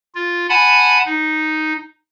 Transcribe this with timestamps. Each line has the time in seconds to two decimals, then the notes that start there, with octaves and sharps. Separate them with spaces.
0.15 F4
0.49 F#5 G#5 A5 B5
1.06 D#4